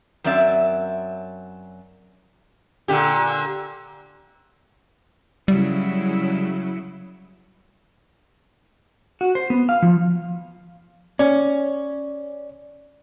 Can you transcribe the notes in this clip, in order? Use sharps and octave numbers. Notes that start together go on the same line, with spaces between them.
F#2 F#3 C4 D5 E5
A#2 D3 G4
C#3 F#3 G3 E4
F#4
C5
B3
F5
F3
C#4 D5